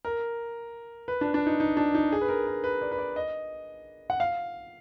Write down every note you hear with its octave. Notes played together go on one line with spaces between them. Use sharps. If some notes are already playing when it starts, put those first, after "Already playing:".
A#4
B4
D4
D4
D#4
D#4
D4
D#4
G#4
B4
A#4
A#4
B4
D5
B4
D5
D#5
F#5
F5